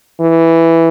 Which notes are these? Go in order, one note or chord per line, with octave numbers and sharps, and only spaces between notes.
E3